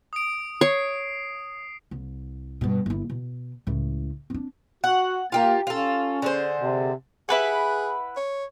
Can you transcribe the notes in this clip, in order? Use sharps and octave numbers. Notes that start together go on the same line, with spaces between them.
D#6 D7
C#5 C7
C2
G2 B2
G1 E4
B2
C#2 A2
C4 D4
F#4 F#5
A#3 F4 G4 A#4
C#4 F4 A4
D3 G#4 C5
C3
E4 G#4 B4 F#5
C#5